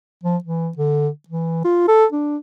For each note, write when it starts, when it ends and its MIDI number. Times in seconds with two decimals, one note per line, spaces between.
0.23 0.37 53
0.44 0.69 52
0.77 1.08 50
1.28 1.62 52
1.64 1.83 65
1.88 2.05 69
2.12 2.37 62